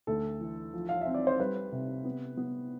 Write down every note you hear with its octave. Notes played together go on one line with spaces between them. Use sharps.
D2 A4
E3
F3
F5
C4 E5
D5
C5
G3 B4
C3
B3
B3